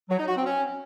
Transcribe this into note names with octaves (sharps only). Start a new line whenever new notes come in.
F#3
D#4
F#4
C4
C#4